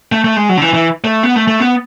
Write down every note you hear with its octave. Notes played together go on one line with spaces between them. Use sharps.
A3
A3
G#3
F#3
D3
E3
E3
A3
B3
A3
A3
B3